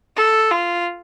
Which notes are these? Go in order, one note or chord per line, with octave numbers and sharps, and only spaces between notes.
A4
F4